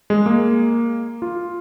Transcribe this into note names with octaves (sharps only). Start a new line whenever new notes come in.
G#3
A#3
F4